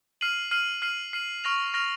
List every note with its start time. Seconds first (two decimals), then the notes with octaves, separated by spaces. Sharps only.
0.21 F6 C7 D#7 F#7
0.51 F6 C7 D#7 F#7
0.82 F6 C7 D#7 F#7
1.13 F6 C7 D#7 F#7
1.44 C#6 F6 A#6 F7
1.74 C#6 F6 A#6 F7